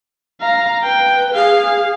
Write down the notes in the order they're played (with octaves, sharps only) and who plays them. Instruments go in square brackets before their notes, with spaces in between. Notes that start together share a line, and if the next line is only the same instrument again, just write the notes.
[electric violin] F5 A#5
[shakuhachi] B4 [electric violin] G5
[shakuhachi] G#4 [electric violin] F5